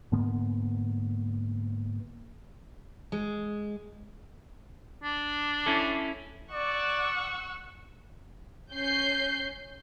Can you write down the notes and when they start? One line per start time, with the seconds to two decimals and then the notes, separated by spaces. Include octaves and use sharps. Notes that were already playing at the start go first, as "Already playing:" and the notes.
0.12 G#2 D3 A#3 B3
3.12 G#3
5.04 D4
5.66 C#4 E4 A4
6.51 D5 F#5 C#6 E6
8.73 C#4 G6 C7